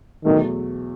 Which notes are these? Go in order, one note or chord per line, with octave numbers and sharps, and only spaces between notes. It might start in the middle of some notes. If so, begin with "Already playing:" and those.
E2 B2 D#3 F#3 A3